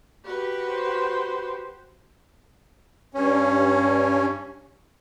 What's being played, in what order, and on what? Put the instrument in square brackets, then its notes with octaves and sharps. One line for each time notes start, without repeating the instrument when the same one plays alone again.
[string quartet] F#4 G4 B4
[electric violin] C5
[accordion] G2 C#4